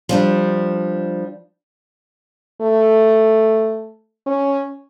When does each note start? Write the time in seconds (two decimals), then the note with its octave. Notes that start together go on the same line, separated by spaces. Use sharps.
0.09 F3 G3 D4
2.62 A3
4.27 C#4